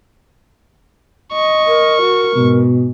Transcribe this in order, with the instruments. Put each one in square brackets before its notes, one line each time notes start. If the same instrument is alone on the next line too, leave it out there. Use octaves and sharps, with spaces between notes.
[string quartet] D#5 [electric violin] C#6
[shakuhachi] A#4
[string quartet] F#4
[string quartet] G#2 [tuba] B2